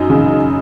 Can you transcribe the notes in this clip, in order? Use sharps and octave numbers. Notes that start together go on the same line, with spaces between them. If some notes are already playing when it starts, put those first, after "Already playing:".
Already playing: F#2 D#4
C#3